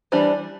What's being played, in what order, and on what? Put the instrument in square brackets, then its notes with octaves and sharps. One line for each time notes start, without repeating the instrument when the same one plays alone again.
[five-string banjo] E3 G3 D4 C5